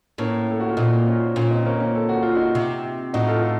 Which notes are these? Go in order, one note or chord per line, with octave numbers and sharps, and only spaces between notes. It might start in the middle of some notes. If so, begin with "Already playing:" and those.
A2 A#3 C#4
A4
F#4
F4
A#2 C4 D#4
C#4 F4
A#2 C#4 F4
C4 D#4
C4
A#3 C#4
A#3 C#4
A4
F#4
F4
D#4 F#4
C3
A2 D#4 F#4
F4 A4
F4 A4